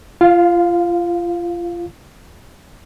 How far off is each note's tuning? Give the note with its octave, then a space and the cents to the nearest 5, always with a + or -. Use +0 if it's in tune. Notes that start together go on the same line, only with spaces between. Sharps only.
F4 -25 F5 +10